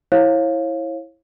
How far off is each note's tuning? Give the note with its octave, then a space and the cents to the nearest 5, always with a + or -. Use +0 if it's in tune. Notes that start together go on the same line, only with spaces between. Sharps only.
E4 -5 C#5 -35 F5 +0